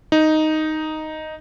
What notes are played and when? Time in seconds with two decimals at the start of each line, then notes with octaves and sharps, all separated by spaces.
0.12 D#4